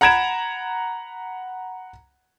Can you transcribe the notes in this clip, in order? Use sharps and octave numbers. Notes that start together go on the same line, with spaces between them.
F#5 A#5 B5 G#6 D7 E7